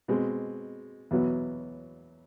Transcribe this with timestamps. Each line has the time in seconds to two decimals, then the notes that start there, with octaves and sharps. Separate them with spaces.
0.08 B2 G#3 C4
1.11 E2 B2 F#3 B3